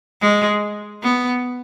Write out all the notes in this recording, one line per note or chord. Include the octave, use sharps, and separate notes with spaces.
G#3
B3